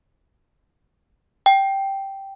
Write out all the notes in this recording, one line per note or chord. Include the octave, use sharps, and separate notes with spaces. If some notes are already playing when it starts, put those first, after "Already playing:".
G5